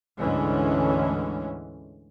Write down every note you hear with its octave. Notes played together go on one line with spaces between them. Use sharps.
D2 G#2 D3 E3 G#3 C#4